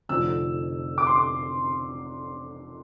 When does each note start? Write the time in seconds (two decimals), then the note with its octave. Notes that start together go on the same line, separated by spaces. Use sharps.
0.09 F1 F2 D3 F3 C4 E6
0.98 D6
1.07 C6
1.16 D6